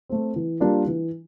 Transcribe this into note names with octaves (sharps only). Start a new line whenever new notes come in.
A3 C4
E3
G3 A#3 D4 F4
E3